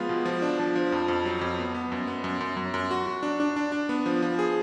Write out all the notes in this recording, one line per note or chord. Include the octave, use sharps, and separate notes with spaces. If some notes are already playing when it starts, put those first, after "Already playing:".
Already playing: F3 G#3 B3 F4
B2
F3
D4
F3
F3
F2
F2
F#3
F2
B3
B3
F#2
B3
F#2
F#2
F#2
F#2
F#4
F#4
D4
D4
D4
D4
B3
F3
F3
G#4